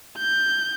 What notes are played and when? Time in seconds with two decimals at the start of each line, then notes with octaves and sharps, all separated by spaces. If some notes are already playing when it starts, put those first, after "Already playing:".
0.18 G6